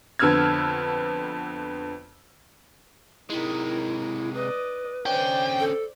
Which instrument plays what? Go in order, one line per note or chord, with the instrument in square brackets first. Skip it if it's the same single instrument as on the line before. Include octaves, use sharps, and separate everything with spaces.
[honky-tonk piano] F2 D3 B3 E6 F6 G#6
[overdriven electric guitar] C3 G#3 [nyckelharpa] D#4 A#4 [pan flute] E4
[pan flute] B4 [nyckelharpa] D5 D#5
[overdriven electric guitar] D3 C#4 [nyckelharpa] C5 D5 [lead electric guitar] G5
[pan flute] A4